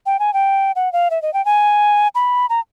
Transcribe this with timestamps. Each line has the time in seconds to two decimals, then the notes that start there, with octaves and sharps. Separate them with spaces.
0.06 G5
0.19 G#5
0.34 G5
0.76 F#5
0.93 F5
1.11 E5
1.22 D#5
1.34 G5
1.45 G#5
2.15 B5
2.49 A#5